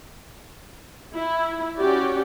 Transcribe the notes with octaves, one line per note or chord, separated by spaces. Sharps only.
E4
C#4 F#4 G4 D5